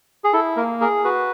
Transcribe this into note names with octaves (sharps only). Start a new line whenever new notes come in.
G#4
E4 A4
A#3 A#4
G#4 A#4
F#4 B4